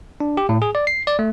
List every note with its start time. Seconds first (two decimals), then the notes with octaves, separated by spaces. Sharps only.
0.20 D4
0.37 G4
0.49 A2
0.62 G#4
0.75 D5
0.87 C7
1.07 D5
1.19 A3